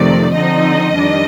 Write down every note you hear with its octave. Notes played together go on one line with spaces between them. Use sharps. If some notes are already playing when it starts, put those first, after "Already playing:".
Already playing: F2 C3 D#3 A3 D5
D3 F3 C4 D#4 D#5
F2 D#3 G3 D4